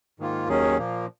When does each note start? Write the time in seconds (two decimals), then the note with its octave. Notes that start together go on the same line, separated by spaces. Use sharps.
0.20 G#2 D#3 A#3 F4
0.48 D#2 D#3 F#3 C#4 G#4
0.78 A#2 F3 A#3